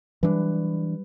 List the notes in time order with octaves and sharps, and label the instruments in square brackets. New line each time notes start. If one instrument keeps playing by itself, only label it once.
[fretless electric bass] E3 D4 [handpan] F#3 G3 B4